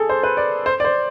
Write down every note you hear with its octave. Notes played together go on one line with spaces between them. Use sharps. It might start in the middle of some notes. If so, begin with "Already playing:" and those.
Already playing: G#4 A4
C5
B4
D5
C5
D5
C5